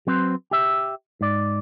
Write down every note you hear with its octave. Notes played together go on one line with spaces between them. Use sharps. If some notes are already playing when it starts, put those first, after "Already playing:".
F#3 C4 B4 C5
G4 E5
G#2 D5